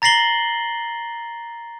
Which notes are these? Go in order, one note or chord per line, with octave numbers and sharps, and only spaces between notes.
A#5 A6 A#6 C7 F#7 G7